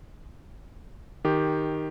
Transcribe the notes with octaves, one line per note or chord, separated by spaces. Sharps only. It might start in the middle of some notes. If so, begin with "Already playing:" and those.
D#3 G4